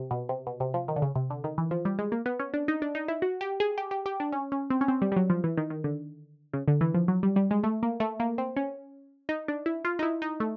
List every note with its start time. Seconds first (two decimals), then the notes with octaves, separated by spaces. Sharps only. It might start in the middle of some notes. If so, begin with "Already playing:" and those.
Already playing: C3
0.11 B2
0.29 C3
0.47 B2
0.60 C3
0.74 F3
0.88 D#3
0.96 D3
1.02 C#3
1.16 C3
1.30 D3
1.44 D#3
1.58 E3
1.71 F3
1.85 G3
1.99 G#3
2.12 A#3
2.26 B3
2.40 C#4
2.54 D4
2.68 D#4
2.82 D4
2.95 D#4
3.08 E4
3.22 F#4
3.41 G4
3.60 G#4
3.78 G4
3.91 G4
4.06 G4
4.20 D4
4.32 C#4
4.52 C#4
4.70 C4
4.81 C#4
4.88 C4
5.02 G3
5.12 G3
5.16 F#3
5.30 F3
5.44 E3
5.57 D#3
5.70 D#3
5.84 D3
6.53 C#3
6.68 D3
6.81 E3
6.94 F3
7.08 F#3
7.23 G3
7.36 G3
7.51 G#3
7.64 A3
7.83 A#3
8.00 A3
8.20 A#3
8.38 C4
8.57 C#4
9.29 D#4
9.48 D4
9.66 E4
9.85 F4
9.99 D#4
10.03 E4
10.22 D#4
10.40 A3